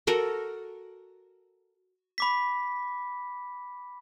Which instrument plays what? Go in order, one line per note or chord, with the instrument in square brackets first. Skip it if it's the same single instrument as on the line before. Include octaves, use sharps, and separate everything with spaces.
[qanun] F#4 A4 A#4
[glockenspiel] B5 D6 B6